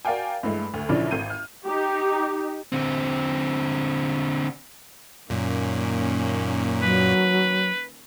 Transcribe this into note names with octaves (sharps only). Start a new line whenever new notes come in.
F#4 A#4 D5 F5 G5 G#5
G2 E3 G#3 A3
D2
A#1 C#3 E3 F3 D4 D5
G#1 G6 D#7
F6
D#4 G4
D3 C4
F#2 A#2 D#3 A#3 C#4
F#3 B4